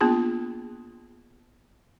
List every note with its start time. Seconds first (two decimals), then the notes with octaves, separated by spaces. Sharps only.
0.01 A#3 B3 D4 F4 G#4